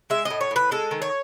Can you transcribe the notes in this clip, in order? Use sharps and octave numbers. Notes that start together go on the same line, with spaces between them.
G#3 E5
D#5
A2
C#5
A2 B4
G#3 A4
D#3
C#5